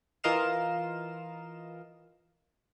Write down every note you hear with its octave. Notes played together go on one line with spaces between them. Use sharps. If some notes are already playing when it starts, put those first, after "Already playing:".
E3 F4 A#4 D#5 F5 E7